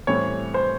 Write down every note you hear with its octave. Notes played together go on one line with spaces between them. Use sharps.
A2 E3 G3 C4 C#5
C5